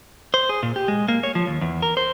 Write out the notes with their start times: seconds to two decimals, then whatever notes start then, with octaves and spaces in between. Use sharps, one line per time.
0.34 C5
0.49 G#4
0.63 A#2
0.76 G4
0.88 G#3
1.08 A#3
1.23 C#5
1.35 F3
1.47 D#2
1.61 E2
1.82 A#4
1.97 C5